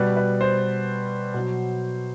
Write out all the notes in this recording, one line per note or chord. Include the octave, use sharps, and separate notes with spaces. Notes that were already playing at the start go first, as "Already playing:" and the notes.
Already playing: B2 G3 B4
B4
C5
B2 F#3